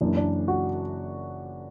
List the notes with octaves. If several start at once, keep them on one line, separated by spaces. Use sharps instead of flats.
F#1 F#2 E3 D4
D4
F#4